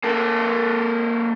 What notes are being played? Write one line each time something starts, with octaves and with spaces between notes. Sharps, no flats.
A#3 A4